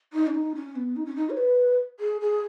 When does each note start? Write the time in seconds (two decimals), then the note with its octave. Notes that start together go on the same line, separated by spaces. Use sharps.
0.13 D#4
0.27 C#4
0.35 D#4
0.55 C#4
0.76 B3
0.96 D#4
1.06 C#4
1.16 D#4
1.30 C#5
1.37 B4
2.00 G#4
2.21 G#4